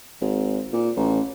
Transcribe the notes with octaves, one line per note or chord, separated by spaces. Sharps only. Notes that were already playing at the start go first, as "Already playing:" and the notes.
G#1
A#2
A1